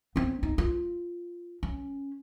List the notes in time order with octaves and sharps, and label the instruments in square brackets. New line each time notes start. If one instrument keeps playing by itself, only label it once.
[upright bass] B3 C4
D#4
F4
C#4